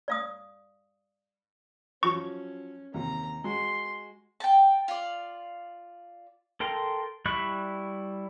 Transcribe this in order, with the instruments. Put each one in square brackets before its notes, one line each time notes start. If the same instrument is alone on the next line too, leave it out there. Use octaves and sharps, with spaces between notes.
[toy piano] D5 F5 D#6
[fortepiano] F3 F#3 [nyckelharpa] C#4 [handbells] C#6
[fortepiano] D#2 C3 [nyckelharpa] A#5
[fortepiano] G#3 F#4 [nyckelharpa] C6
[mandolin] G5 A5
F4 D5
[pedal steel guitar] A4 A#4 G5 C6
G3 E4 B5 C#6 F#6